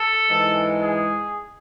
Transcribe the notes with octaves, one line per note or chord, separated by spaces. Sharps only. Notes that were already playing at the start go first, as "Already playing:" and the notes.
Already playing: A4
G#2 E3 G#3
G#4